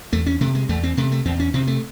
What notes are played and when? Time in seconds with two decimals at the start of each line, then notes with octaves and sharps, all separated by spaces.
0.12 E2 A3
0.26 C#4
0.41 C3 A3
0.55 G#3
0.69 E2 A3
0.83 C4
0.97 C3 A3
1.12 A3
1.25 E2 C4
1.40 C#4
1.54 C3 C4
1.67 A3